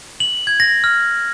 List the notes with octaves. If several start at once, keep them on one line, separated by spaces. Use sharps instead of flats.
F#7
G#6
A#6
F6